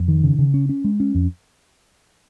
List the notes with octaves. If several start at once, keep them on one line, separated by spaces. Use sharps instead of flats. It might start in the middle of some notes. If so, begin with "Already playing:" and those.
Already playing: F2
D#3
C#3
C#3
C#4
C#4
G#3
C#4
F2